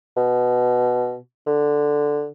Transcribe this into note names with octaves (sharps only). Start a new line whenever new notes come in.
B2
D3